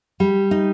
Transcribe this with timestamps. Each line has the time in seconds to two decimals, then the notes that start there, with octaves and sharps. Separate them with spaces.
0.20 G3
0.51 D#4